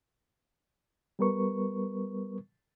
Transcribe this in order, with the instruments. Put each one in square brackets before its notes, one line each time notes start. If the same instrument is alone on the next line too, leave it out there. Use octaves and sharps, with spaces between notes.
[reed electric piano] G3 B3 A#4 B4 C#6